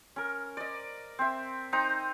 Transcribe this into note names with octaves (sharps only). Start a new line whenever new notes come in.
C#4 A#4
D5 D#5
C4 E5
C4 D#4 A#5 D#6